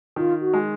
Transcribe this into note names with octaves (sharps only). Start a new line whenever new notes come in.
D#3 F4
F#4
G#3